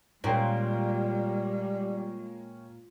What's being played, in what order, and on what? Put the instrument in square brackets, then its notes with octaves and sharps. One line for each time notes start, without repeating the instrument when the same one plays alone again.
[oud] A#2 [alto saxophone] G3 [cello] G#3 [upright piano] C#4 G5